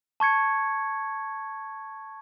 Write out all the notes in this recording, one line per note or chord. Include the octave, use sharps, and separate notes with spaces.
A5 C#6 G#6 C#7